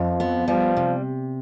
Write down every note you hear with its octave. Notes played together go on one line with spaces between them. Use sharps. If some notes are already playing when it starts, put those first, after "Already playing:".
Already playing: F2 F3
B3
F3 G3
C3